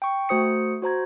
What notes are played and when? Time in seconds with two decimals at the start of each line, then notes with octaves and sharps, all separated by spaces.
0.02 G5 C#6
0.29 A3 F#4 C5 D#6 C#7
0.82 F#4 C5 A#5 G#6